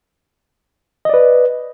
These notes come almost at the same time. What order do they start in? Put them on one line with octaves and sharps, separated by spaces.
D#5 D5 B4